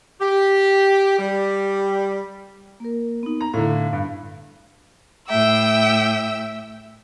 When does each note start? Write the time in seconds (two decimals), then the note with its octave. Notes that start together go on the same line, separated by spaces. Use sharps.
0.21 G4
1.19 G3
2.80 A#3 A#4
3.23 B3 D#4
3.41 A#5
3.54 A2 D3 F5
3.93 G2
5.29 A2 E5 G5 E6